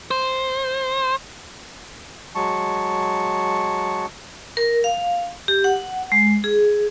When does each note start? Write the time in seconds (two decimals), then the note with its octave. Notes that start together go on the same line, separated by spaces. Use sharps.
0.11 C5
2.35 F#3 G#3 A5 C#6
4.57 A#4
4.84 F5
5.48 G4
5.64 F#5
6.12 G#3
6.44 G#4